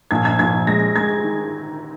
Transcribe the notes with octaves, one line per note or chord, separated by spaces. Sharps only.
A#1 G#6
G#6
A#1 G#6
G#3 A#6
G#3 G#6
D#3